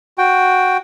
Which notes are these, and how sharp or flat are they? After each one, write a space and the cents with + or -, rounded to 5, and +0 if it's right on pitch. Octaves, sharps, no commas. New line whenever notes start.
F#4 +0 G5 +0